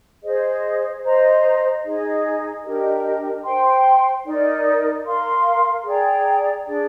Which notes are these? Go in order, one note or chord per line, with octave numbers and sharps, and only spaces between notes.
G#4 C5 D#5
C5 D#5 A#5
D#4 G#4 D#5
D4 G4 A#4 D#5
C5 G5 C6
D#4 A#4 D5
A#4 F5 C6
G#4 D5 G5 A#5
D4 G#4 D5